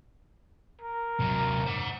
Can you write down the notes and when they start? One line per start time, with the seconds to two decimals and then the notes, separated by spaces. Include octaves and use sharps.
0.81 A#4
1.20 C3 F#3
1.66 C5 F#5